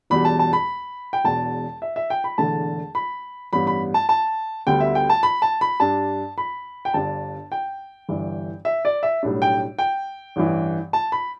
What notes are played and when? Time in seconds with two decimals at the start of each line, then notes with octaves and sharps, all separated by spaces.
0.10 E1 E2 B2 G3 B5
0.25 A5
0.39 A5
0.53 B5
1.13 G5
1.24 E1 E2 B2 A5
1.82 E5
1.96 E5
2.10 G5
2.24 B5
2.38 E1 E2 D3 A3 D4 A5
2.95 B5
3.53 A1 G2 G3 B3 B5
3.67 B5
3.94 A5
4.09 A5
4.67 D2 D3 G3 B3 G5
4.81 E5
4.95 G5
5.10 A5
5.23 B5
5.42 A5
5.61 B5
5.80 G2 G3 D4 A5
6.38 B5
6.85 G5
6.94 G1 G2 G3 D4 A5
7.52 G5
8.09 G1 G2 E3
8.65 E5
8.85 D5
9.03 E5
9.23 B1 A2 G3 D4
9.42 G5
9.79 G5
10.36 A1 G2 E3
10.93 A5
11.12 B5